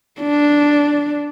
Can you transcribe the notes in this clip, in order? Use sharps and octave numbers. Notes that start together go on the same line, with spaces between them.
D4